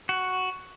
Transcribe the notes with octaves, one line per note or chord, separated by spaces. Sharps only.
F#4